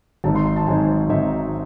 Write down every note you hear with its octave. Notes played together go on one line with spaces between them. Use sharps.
G#1 G#2 F#3 C4 D#4 A5
C6
C6
A5
G#1 G#2 F#3 C4 D#4 G#5
G#1 G#2 F#3 C4 D#4 E5